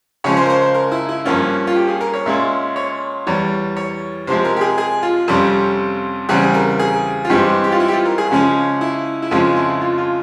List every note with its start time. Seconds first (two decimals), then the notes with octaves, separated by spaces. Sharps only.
0.24 C#3 F3 G#3 C#5
0.37 C5
0.45 A#4
0.50 C5
0.62 C5
0.74 A#4
0.92 E4
1.09 E4
1.25 G2 F3 A#3 C#4 F4
1.67 F4
1.76 G4
1.88 G#4
2.01 A#4
2.13 C#5
2.26 A#2 G#3 C#4 E5
2.76 C#5
3.26 E2 E3 G3 C#5
3.76 C#5
4.27 C3 F3 G#3 C5
4.45 A#4
4.56 G4
4.61 G#4
4.78 G#4
5.03 F4
5.28 F2 C3 G3 C#4
6.29 E2 C#3 G3 C4 G#4
6.54 A#4
6.79 G#4
7.25 F4
7.29 G2 E3 G#3 C4 G4
7.64 G4
7.72 F4
7.80 E4
7.88 G4
7.93 F4
8.05 A#4
8.18 G#4
8.31 C#3 F3 G#3 C#4
8.81 E4
9.22 E4
9.31 F2 C#3 F3 G#3 F4
9.56 E4
9.81 F4
9.98 F4